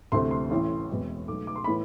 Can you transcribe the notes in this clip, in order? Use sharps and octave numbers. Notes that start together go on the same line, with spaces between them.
D2 C3 E3 A3 C4 C6
C6
A1 A2 E3
E2 B2 G#3 C4
B1 B2 A3 D6
D6
C6
A2 E3 B3 B5